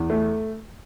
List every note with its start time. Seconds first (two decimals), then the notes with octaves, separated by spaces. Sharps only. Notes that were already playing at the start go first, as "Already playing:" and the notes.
Already playing: E2
0.10 A3